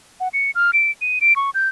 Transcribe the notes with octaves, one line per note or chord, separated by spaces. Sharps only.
F#5
C#7
F6
D7
D#7
D7
C#6
G6